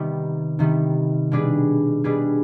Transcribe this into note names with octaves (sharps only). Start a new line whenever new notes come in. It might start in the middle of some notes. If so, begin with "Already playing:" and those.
Already playing: C3 D#3 G3 B3
C3 D#3 G3 B3
B2 G3 D4 G#4 B4
B2 G3 D4 G#4 B4